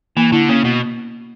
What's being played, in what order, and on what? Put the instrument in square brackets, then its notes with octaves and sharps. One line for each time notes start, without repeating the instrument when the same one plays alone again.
[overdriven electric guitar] E3 [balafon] A#3
[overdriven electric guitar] D3 [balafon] E4
[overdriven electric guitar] C#3 [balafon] A#3
[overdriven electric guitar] B2